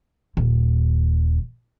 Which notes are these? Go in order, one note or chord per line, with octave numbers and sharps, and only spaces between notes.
D#1 D#2